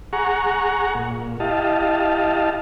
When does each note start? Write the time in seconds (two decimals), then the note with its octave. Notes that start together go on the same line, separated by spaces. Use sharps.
0.13 G#4 F#5 A#5 C#6
0.95 A#2
1.40 E4 G4 D#5 F5 A5